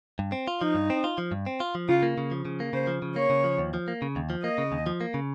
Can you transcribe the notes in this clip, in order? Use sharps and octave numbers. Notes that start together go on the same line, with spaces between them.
G2
C4
F4
F3 D#4
G2
C4
F4
F3
G2
C4
F4
F3
C#3 F4
A#3
C#3
F3
C#3
A#3
C#3 C5
F3
C#3
A#3 C#5
C#3
F3
D#2
F3
A#3
C#3
D#2
F3
A#3 D#5
C#3
D#2
F3
A#3
C#3